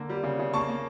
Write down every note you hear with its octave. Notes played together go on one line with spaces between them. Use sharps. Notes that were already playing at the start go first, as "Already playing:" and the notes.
Already playing: D3 A#3 A5
G3
C#3
C#3
A#3 A5 C#6
A#3